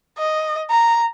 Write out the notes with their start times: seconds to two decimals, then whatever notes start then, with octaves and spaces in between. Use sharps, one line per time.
0.18 D#5
0.70 A#5